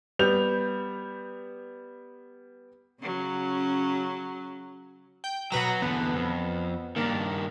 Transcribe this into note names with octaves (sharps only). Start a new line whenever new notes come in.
G3 B3 G6 F7
C#3 F#3 C#4
G5
B2 F#3 F#4 B4 A#5
E2 D3 B3
F2
G2 D#3 A#3 D4